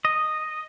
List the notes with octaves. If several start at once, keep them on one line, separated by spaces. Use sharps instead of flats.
D#5